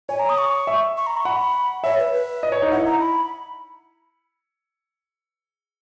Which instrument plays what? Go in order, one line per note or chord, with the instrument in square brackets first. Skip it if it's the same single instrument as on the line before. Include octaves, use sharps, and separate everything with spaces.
[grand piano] C#5 [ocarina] G#5
[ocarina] A#5
D#6
C#6
[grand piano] E5
[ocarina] C#6
A#5
C#6
[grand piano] F#5 [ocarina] B5
[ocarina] C#5 [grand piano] E5
[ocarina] B4
B4
[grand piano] D#5
C#5
D#4
[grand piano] E4 [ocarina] F#5
[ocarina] A#5
B5